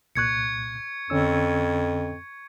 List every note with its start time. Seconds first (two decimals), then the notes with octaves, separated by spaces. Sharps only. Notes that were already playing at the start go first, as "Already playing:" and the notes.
0.15 C2 A#2 C#6 F#6 G#6 C#7
1.10 F2 D3 C#4 E6